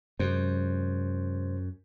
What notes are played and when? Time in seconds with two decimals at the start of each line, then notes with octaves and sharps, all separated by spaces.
0.19 F#2 C3 G#3 C5